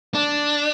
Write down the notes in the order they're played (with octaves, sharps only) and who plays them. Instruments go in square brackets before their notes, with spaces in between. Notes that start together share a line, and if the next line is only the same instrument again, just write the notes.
[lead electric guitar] D4